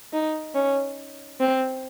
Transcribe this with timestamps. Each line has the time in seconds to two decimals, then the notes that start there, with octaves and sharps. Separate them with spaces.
0.13 D#4
0.55 C#4
1.40 C4